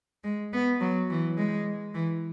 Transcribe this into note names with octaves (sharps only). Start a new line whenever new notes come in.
G#3
B3
F#3
E3
G#3
E3